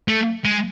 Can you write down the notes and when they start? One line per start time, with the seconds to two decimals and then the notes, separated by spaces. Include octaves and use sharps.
0.08 A3
0.45 G#3